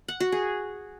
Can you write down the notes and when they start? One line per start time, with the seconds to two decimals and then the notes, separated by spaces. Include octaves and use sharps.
0.08 F#5
0.20 F#4
0.32 G#4